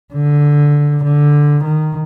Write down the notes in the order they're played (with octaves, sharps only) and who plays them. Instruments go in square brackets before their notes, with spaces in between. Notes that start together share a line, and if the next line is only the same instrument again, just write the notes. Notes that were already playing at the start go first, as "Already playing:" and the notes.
[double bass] D3
D3
D#3